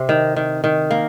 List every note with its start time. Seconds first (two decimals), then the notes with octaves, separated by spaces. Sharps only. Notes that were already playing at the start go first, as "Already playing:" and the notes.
Already playing: C3 C4
0.09 D#3
0.36 D#3
0.64 D#3
0.91 A#3